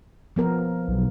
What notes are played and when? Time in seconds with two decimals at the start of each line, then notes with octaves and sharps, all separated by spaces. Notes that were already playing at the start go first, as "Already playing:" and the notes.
0.36 F3 B3 A#4
0.88 B1